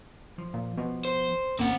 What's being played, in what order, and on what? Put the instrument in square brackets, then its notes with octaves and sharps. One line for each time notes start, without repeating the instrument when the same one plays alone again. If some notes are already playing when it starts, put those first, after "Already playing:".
[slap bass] F3
[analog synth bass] A#2
[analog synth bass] B2 [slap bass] F3
[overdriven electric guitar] C5
[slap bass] G#1 C#4 [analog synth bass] A#3 [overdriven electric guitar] C4 F#5